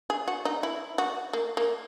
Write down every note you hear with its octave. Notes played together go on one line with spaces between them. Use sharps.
G#4
F#4
D#4
E4
F#4
A#3
A#3